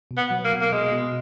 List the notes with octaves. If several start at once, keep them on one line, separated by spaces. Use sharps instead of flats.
B2
B3
F#3
A#3
B2
A#3
B2 G#3
B2